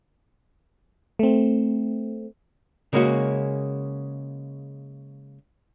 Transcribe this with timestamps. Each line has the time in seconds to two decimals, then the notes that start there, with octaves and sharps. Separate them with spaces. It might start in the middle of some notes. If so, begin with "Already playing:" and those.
1.19 A3 C4
2.93 C#3 G#3 A#3 C#4 F#4